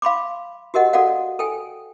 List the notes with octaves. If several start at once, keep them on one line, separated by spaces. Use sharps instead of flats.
F5 B5 C6 D6
F#4 G4 A#4 D#5 F#5
F#4 A4 D5 F5 F#5
A4 G5 G#5